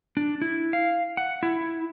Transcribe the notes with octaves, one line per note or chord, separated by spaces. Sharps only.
D4
E4
F5
F#5
E4